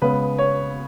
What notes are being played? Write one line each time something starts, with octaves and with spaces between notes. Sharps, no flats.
C#3 G#3 B3 B4
C#5